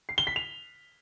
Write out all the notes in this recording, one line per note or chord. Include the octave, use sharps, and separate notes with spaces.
C7
G7
B6
F7